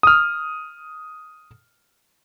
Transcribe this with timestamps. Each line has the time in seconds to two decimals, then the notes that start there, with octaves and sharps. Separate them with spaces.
0.03 D#6 F6